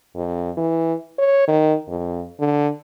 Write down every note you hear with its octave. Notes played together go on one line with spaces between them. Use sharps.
F2
E3
C#5
D#3
F2
D3